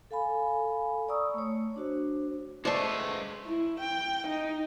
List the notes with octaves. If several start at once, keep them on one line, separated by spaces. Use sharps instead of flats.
A4 F5 G#5 B5
D5 A#5 C#6 D#6 E6
A3 C#5
D4 F#4 C5
G#3 A3 B4 C5 D5 A5 C#6 D6
E4
G5
D#4